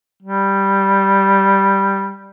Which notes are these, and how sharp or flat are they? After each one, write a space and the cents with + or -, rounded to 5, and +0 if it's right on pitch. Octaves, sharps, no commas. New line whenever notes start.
G3 +0